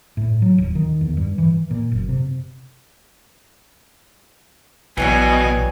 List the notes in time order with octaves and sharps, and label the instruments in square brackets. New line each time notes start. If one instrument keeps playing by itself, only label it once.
[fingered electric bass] A2
F#3
D#1
D#3
E2
G2
E3
A#2
F#1
C3
[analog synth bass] A#1 [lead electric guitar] B2 [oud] E3 F#3 G3 [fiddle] G#5